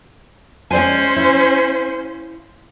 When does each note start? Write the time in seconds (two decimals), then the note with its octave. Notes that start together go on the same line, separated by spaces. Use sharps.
0.71 G#3 C#4 C5 D5 G#5
1.16 E4 F5